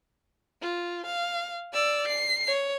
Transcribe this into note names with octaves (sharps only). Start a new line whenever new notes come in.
F4
F5
D5 E6
C7
C#5